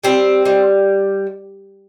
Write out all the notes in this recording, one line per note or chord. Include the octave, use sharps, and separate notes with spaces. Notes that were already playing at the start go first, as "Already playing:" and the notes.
G3 C4
G3